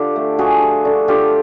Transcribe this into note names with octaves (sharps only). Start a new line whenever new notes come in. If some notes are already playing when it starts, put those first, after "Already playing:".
Already playing: D3 F4 G4
A3
F3 F#4 G#4
F3
D3
D3 F4 G4